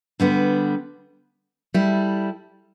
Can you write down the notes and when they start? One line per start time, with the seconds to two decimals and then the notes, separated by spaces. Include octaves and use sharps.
0.20 D3 G3 B3
1.74 G3 E4 A4